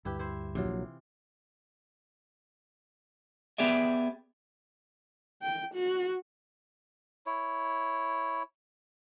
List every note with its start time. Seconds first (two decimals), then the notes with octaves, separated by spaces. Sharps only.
0.05 D2 G2 E4 G4 B4
0.19 E4 C5
0.55 A#1 C3 E3 F#3 F4
3.58 B3 G4 G#4 D5 E5
5.43 G5
5.74 F#4
7.26 E4 C#5